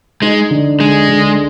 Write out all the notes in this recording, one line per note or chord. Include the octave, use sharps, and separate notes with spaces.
G#3 D#4
D3
D3 G#3
D3